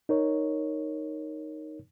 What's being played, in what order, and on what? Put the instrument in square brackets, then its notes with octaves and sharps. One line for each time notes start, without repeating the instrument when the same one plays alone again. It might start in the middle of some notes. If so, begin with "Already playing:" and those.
[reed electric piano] D#4 A#4 C#5